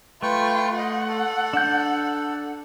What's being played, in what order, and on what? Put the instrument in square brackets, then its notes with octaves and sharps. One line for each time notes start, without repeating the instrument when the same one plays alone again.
[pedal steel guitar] A3 [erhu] F4 [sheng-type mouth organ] B4 G5 C#6
[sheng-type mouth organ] D#5 [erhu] F#5
[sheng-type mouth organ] A4
[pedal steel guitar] D4 G6